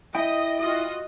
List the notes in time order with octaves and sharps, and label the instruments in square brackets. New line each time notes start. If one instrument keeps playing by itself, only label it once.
[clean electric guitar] E4 G5 [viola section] D#5
[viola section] F4 F#4 D#5